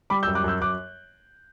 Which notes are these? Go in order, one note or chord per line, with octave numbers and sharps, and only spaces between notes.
G3 B5 D6
E6 G6
F#2
D6 F#6
F#2 E6 G6
F#2 D6 F#6